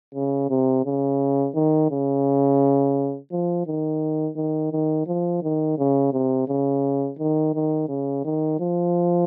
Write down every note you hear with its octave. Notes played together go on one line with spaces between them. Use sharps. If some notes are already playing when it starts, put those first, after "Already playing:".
C#3
C3
C#3
D#3
C#3
F3
D#3
D#3
D#3
F3
D#3
C#3
C3
C#3
D#3
D#3
C#3
D#3
F3